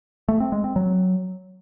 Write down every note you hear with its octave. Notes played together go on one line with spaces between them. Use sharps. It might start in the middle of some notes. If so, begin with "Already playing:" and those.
A3
C4
G#3
C4
F#3